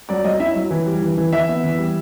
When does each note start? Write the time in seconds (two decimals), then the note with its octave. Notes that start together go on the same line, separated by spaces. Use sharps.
0.09 F#3 D5
0.25 F#3 D#5
0.40 E4 E5
0.56 F#3
0.71 E3
0.86 G3
1.02 E3
1.17 E3
1.33 E3 E5
1.48 B3
1.64 E3
1.78 G3